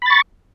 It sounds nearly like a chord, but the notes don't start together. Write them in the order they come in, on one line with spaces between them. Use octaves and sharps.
B5 A6 C#6